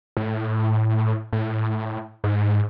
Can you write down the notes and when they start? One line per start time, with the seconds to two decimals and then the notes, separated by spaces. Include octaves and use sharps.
0.17 A2
1.33 A2
2.24 G#2